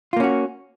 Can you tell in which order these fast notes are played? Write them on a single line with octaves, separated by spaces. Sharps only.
F4 A#3 C#4 F#4